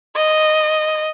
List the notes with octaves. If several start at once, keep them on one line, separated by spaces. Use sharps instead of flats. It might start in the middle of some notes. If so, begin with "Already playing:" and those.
D#5